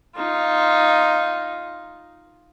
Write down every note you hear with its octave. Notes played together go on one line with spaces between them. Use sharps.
D#4 F4